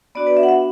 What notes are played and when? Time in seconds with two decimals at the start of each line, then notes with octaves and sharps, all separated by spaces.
0.15 B3 D4 F#4 D5
0.27 B4
0.37 E5
0.43 F#5
0.49 E5